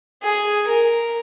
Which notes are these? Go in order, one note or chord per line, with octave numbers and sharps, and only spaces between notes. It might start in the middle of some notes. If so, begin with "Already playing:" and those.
G#4
A#4